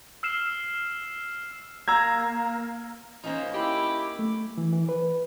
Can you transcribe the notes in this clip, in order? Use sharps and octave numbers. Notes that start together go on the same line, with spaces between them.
E6 F6 C7 E7
A#3 A#5 E6 G#6
A#3 C#4 D#4 F4 C5
E4 G4 B5 D6
A3
E3
E3
B4